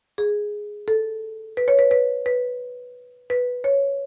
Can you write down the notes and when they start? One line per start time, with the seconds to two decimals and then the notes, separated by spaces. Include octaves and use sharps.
0.18 G#4
0.88 A4
1.57 B4
1.68 C#5
1.79 B4
1.91 B4
2.26 B4
3.30 B4
3.64 C#5